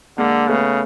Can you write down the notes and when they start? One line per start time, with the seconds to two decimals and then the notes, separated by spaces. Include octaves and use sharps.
0.18 D3 G#3 A#3
0.48 C#3 A3 B3